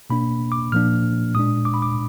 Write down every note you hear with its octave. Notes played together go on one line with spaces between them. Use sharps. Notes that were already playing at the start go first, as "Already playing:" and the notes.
B2 A#3 D4 B5
D6
A#2 F3 A#3 D4 F6
A#2 G#3 D4 D#6
D6
B5
D6